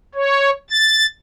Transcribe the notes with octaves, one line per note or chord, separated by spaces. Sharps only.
C#5
A6